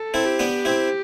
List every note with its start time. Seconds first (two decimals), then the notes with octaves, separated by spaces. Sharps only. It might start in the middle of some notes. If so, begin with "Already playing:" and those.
Already playing: A4
0.14 C4 E4
0.26 G4
0.39 B3 D4
0.65 C4 E4